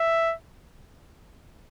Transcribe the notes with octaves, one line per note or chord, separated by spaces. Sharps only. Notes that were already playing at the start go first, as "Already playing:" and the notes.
Already playing: E5